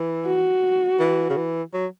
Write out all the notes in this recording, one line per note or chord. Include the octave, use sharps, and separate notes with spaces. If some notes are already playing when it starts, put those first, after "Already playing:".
Already playing: E3
F#4
E3
C#3
E3
F#3